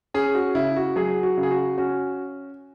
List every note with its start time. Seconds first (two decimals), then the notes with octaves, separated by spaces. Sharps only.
0.14 C#4 G#4
0.35 F#4
0.55 C#3 E4
0.76 F#4
0.96 F#3 G#4
1.23 F#4
1.38 C#3
1.43 G#4
1.51 F#4
1.78 C#4 F#4